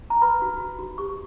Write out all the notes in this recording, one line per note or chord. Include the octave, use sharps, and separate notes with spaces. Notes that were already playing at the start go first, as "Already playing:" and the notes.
A#5
B4 B5
F#4
F#4
F#4
G4 C#6